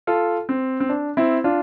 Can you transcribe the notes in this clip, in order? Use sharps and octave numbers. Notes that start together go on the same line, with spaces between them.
F4 A4
C4
C4
D4
C4 E4
D4 F4